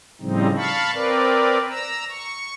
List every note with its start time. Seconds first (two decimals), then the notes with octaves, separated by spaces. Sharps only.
0.21 A2 C#3 F3 G3 C4 D#4
0.56 F5 A5 B5 C#6
0.94 C4 A#4 B4 D5
1.69 A#5 E6
2.09 C#6